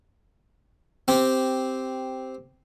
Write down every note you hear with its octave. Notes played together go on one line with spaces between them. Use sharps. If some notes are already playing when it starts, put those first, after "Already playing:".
C4 G4